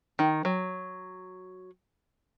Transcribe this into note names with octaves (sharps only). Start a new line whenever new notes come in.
D#3
F#3